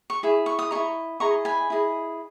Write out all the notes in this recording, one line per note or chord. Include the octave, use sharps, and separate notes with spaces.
C#6
E4 G#4
C#6
D#6
E4 G#4 D#5 A#5 C#6
E4 G#4 D#5 A#5 C#6
G#5 B5
E4 G#4 D#5